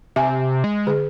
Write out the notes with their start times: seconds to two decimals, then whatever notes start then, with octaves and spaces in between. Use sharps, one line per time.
0.16 C3 E5 G#5
0.64 G#3
0.87 D3 G#4